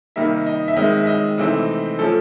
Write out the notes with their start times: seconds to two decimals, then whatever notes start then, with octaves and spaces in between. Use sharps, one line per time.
0.16 C3 D#3 G3 A#3 D#4 E5
0.46 D#5
0.68 E5
0.76 D#3 G#3 C4 D#5
0.98 E5
1.07 D#5
1.38 C3 E3 A3 C4 D#4
1.99 F3 A3 C#4 A4